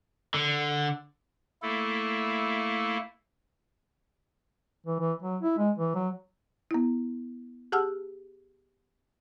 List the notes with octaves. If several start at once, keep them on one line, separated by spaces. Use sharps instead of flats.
D3
A3 A#3 E4 A4
E3
E3
F#3
E4
G#3
E3
F#3
B3 E4
G4 G#4 F#5 A5 E6 F6